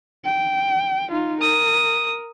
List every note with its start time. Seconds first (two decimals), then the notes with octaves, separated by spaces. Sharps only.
0.25 G5
1.10 D#4 F4
1.41 A#4 D#6